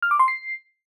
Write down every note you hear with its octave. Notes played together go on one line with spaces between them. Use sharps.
F6
D6
C6
C7